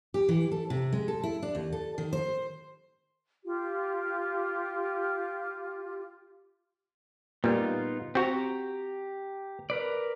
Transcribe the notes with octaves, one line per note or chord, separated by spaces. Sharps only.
G4
E3
A4
C3
G#3
A4
E4
D4
D#2
A4
D#3
C5
F4 G4
A#2 G3 B3 D#4 F4
C4 F#4 G4 A#5
A#4 B4 D5